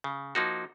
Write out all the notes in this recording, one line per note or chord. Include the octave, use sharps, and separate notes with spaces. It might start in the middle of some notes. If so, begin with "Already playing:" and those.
C#3
F3 A#3 D#4 F#4